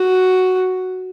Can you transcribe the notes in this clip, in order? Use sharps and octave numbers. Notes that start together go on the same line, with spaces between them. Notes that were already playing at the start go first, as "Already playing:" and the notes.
Already playing: F#4